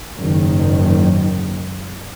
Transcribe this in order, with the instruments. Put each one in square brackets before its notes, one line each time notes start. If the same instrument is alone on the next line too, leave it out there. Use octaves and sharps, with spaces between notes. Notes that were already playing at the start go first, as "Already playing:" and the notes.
[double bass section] F#1 G#2 D#3